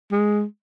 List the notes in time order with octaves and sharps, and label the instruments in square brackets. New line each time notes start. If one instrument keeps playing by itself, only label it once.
[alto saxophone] G#3